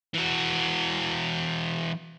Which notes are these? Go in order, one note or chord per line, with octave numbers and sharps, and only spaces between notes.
E3 F#4